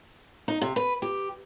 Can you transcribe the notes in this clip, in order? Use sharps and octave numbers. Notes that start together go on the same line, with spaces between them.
D#4
C3
B4
G4